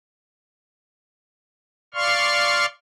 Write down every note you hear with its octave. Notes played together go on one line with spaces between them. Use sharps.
D5 F5 C6 C#6 F6